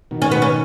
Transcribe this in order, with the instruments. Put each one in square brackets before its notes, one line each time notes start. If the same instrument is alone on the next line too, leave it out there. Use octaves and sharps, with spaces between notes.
[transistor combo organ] B2 D#3
[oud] C#4
B3
C#4